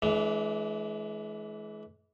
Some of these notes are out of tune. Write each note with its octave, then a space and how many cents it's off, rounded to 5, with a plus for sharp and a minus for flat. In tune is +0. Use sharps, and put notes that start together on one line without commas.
E3 +0 G#3 +45 D4 -15